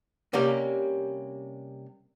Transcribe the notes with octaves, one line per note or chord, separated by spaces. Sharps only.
C3 G3 A#3 C#4 G4